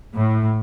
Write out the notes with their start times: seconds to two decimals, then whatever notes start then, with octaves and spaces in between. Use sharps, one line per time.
0.15 A2